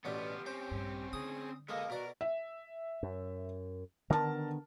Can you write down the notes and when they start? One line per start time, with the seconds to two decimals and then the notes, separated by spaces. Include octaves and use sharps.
0.05 A1 B2 B3 D4 F4 G4
0.46 C4 C#4 C5
0.71 A#1 G2
1.13 D3 G#4 D#6
1.69 G#3 A#3 B3 A4 D#5
1.90 B2 F#4 A#4 D5
2.21 E5
3.03 F#2
4.10 D3 D#3 B3 A#4 A5